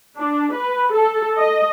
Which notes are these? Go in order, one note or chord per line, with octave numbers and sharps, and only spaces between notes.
D4
B4
A4
D#5